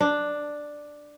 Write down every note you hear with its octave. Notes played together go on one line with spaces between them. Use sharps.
D4